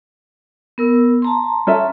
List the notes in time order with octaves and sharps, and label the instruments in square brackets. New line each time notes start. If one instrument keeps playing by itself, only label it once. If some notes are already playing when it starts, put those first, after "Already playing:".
[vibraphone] B3 A#4 E6
A5 A#5 C6
[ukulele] C#4 A4 E5